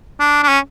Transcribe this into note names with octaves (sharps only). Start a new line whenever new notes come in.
D4
D4
C#4